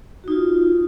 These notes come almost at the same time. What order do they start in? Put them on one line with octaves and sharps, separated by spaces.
F#4 D#4 F4